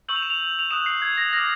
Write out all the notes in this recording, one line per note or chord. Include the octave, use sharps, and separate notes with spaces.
C#6 E6 G6 F#7
F7
E7
F7
F7
D#6 F#6 E7
C7
G#6
A#6
D6 F6 A#6